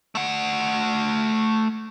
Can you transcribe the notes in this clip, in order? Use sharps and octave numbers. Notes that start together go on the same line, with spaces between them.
A3 F#5